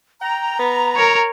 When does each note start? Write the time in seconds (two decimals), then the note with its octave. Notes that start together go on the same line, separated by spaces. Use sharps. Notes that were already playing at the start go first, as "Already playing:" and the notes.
0.21 G5 A#5
0.59 B3
0.96 A#4 C#5